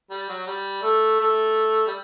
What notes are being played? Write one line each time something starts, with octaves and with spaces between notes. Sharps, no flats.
G3
F#3
G3
A3
A3
G3